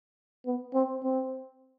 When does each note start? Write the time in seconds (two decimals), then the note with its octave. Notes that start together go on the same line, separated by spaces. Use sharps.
0.46 B3
0.74 C4
1.03 C4